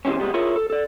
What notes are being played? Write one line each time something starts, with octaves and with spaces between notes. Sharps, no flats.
C3 E3 G#3 C4 C#4
C3 G3 G#3 B3
E4 F4 G#4 A#4 C#5
A4
A4 D5